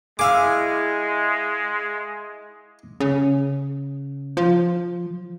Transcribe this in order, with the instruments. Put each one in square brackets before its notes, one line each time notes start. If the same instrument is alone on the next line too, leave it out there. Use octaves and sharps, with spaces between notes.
[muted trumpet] G#3 [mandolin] E4 G#4 [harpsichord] F5 D6
[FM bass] C#3
F3